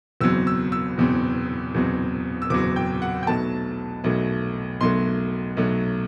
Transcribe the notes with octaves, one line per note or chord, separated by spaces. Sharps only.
F#1 E2 B2 F#3 C4 E6
E6
E6
F#1 E2 B2 F#3 C4
F#1 E2 B2 F#3 C4
E6
F#1 E2 B2 F#3 C4 D6
G5
F#5
G5
B1 B2 F#3 A3 A5
B1 B2 F#3 A3
B1 B2 F#3 A3 C6
B1 B2 F#3 A3